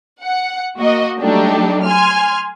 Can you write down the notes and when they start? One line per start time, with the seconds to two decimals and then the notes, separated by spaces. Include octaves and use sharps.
0.23 F#5
0.77 A#3 F#4 D#5
1.18 F#3 G3 A3 D4 D#4 G4
1.84 G#5 C6 F6